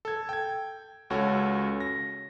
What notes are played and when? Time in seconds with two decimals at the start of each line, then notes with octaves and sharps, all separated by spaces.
0.05 A4 G#6
0.29 G5 G#6
1.10 C#2 C#4 F#4 A4 C#5
1.80 A#6